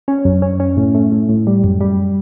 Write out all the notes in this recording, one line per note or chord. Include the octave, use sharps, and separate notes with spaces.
C#4
F#2
C#4
C#4
A2
A3
A2
A2
G3
F#2
G3